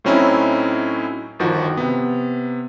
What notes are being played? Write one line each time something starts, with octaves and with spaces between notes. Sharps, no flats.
A2 F#3 C4 C#4 D#4 E4
G1 D#3 F3 F#4
C3 B3